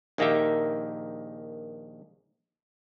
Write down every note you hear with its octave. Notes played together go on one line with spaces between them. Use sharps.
A#1 D#3 A#3 D#4 G4 E5